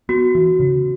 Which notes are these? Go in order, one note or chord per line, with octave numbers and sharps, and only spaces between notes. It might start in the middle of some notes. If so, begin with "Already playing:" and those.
B3 F#4
E3
C#3